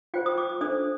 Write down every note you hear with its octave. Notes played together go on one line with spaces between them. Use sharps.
F4 C5 G5
D#6
D6
D#6
D4 A4 C5 D#6